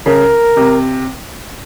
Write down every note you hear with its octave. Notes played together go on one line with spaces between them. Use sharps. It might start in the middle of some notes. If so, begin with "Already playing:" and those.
C#3 A#4
C3